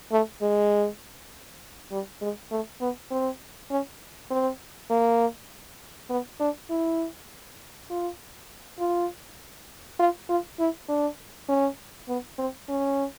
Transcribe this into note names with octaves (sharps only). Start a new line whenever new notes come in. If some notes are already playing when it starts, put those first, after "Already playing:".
A3
G#3
G3
G#3
A3
B3
C4
C#4
C4
A#3
B3
D4
E4
F4
F4
F4
F4
E4
D4
C#4
B3
C4
C#4